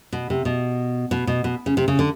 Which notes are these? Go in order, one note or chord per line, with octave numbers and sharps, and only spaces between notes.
B2
C3
B2
B2
B2
B2
C#3
C3
C#3
D3